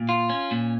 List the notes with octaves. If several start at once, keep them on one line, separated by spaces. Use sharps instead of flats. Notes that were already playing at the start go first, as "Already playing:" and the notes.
Already playing: A#2
F4
C#4
A#2